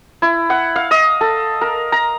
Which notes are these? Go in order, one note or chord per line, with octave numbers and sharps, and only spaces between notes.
E4
F#5
F5
D#5
A4
A#4
A#5